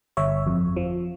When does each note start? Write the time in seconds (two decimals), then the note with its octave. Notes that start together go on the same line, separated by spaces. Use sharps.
0.17 G1 C#5 E5
0.47 F2
0.76 F3